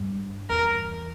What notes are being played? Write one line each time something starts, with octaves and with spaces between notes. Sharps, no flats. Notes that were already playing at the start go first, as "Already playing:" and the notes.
Already playing: G2
E2 A#4